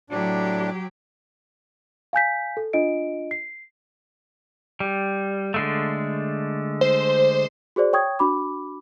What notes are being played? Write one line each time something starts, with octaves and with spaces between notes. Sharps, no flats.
A2 F#3 D4 G4
F5 G#5 G6 B6
A4
D4 F4 D#5 D7
C7
G3
D3 G#3 A3
C5
F#4 G#4 C5 D5
C#5 G5 C#6 D#6 G#6
D4 F#4 B5 D6